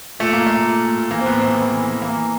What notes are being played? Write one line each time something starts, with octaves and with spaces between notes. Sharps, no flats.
A#2 A3
A#2 A#3
A#2 A3
A#2
A#2
A#2
E3 A#3
C4
A2 B3
E3 C4
E3
E3
E3
E3 A#3
E3